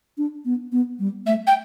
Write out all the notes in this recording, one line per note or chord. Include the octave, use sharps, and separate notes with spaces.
D4
B3
B3
G3
A3 E5
G5